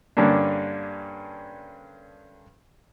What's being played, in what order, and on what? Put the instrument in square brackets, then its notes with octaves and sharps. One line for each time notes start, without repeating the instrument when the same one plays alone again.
[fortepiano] G2 D3 A#3 C#4 D4